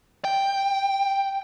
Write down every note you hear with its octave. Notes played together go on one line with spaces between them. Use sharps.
G5